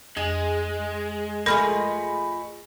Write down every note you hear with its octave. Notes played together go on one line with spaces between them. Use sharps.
F2 G#3 G#4
F3 A3 G#4 A#4 D#5 B5 F6 A#6